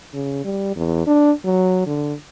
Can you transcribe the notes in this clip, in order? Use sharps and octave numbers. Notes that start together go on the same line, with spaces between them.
C#3
G3
E2
D4
F#3
D3